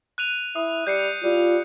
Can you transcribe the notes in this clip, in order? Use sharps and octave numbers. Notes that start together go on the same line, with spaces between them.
F#6 D#7 F7
E4 D#6
G3 G6 C7 C#7
G3 F4